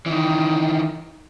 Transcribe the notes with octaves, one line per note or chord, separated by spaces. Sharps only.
D#3 E3